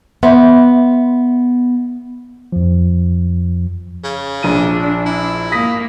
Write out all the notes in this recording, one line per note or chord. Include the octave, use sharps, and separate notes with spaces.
B3 E5 C6
F2 F3
C#3
A#1 D4 D#7
E4
A#3 D#6 A#6 B6